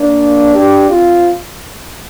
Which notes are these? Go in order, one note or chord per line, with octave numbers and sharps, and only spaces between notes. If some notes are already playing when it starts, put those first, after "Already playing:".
Already playing: A#3 D4
D4 G4
C4 F4